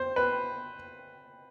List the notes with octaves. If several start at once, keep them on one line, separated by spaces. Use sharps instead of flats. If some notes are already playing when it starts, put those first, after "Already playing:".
Already playing: C5
B4